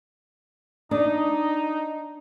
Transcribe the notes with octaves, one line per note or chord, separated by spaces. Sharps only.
D4 D#4